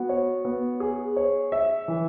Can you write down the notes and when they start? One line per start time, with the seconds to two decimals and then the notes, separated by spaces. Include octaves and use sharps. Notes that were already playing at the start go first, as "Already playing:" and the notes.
Already playing: B3 F#4
0.09 C#5
0.45 B3
0.80 G#4
1.16 C#5
1.52 E5
1.88 E3